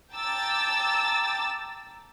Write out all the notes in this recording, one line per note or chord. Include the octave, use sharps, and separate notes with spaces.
G5 A5 A#5 D6 E6 A6